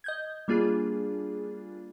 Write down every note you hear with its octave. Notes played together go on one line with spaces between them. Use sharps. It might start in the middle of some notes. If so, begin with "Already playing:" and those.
D#5 G6 G#6
G3 A#3 D4 F4 G#4